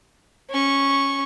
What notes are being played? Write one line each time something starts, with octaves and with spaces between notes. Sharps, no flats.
C#4 C#6